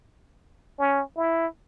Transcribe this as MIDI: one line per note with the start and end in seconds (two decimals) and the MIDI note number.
0.79 1.02 61
1.17 1.47 64